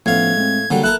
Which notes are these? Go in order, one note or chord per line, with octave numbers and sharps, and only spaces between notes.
A2 F3 B3 C#4 F5 G#6
G#3 C4
D3 F#3 G3 A#3
E4 A4 A#4 F#6